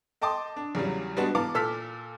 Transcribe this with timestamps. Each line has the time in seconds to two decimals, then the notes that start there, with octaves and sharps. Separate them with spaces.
0.22 D#5 G5 A5 C6 D6 D#6
0.56 D4
0.75 E2 C#3 E3 F#3 G3
1.17 G3 G#3 B3 D4 F#4
1.35 E3 B3 F5 A5 A#5 D6
1.55 A#2 A4 E6 F6 B6